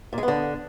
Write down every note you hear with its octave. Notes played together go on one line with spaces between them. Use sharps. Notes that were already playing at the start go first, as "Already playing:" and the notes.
A#2
G#3
B3
D3